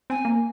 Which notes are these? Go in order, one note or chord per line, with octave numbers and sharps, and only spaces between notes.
C4 G#5
A#3